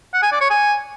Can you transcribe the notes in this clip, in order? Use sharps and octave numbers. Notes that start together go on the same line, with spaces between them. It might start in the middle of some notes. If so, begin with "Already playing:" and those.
F#5
G#5
D5
C#5
G#5